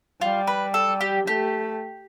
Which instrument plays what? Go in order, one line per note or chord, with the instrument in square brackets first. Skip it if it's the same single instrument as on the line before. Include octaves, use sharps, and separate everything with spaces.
[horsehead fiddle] G3 [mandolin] F4
[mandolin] B4
A4
G4
[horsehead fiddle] A3 [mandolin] G4